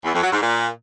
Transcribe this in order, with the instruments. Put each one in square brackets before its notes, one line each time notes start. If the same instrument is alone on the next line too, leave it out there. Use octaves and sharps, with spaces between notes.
[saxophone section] E2
F2
F#3
G#2
A#2